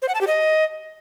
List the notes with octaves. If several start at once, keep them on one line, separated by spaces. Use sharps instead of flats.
C5
F#5
A5
G4
D#5